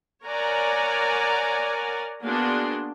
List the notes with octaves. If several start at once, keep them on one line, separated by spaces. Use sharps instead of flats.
A#4 C#5 D5 F#5 G#5 A#5
A#3 B3 D4 F#4 G#4 C6